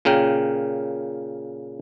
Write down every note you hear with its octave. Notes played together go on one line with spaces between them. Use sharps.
A#2 C#3 A#4 G5